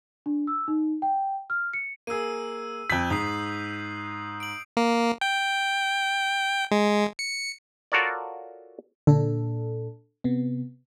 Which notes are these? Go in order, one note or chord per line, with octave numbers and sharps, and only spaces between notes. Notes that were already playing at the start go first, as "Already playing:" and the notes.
D4
E6
D#4
G5
F6
C#7
A#3 G#4 E6 D#7
F2 G6 B6 F#7
G#2 D#6 C7
D7 F#7
A#3
G5
G#3
C#7
F4 F#4 A4 A#4 C#5 D5
A#2 D3 D4 A4
C3 B3